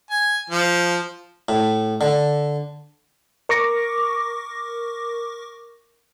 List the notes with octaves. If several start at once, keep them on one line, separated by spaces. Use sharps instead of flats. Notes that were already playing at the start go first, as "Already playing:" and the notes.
G#5
F3
A2
D3
A#4 C#6 D6 A#6